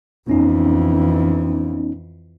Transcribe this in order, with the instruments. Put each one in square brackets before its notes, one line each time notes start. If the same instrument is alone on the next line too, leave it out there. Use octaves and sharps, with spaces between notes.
[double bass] F2 E3 [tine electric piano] B3 C#4 D#4